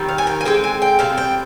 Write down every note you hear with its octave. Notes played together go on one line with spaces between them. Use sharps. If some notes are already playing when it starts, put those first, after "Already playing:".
Already playing: D#3 G3 C4
F5
G#5
G5
G#5
D3 G#3 C4 G5
G#5
G5
C3 G3 C4 F5
G5